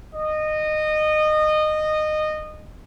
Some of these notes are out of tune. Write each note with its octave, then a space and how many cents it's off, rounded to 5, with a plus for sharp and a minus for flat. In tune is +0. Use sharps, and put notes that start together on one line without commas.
D#5 -20